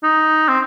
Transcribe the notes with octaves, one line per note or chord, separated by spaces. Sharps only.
D#4
C4